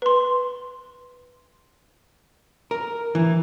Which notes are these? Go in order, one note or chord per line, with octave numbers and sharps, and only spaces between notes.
B4 C6
A#4
E3